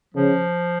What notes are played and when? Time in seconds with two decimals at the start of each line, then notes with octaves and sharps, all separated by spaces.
0.15 C#3 F3